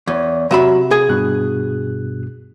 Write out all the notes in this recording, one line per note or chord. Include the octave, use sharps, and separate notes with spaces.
E2 C#5
C3 F#3 E5 B5
G#4
G2 B2 F#6